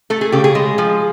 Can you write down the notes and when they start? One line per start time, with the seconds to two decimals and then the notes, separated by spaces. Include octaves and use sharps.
0.10 A3 A4
0.21 G#4
0.32 C#3 G4
0.44 G#4
0.55 G#3
0.78 F3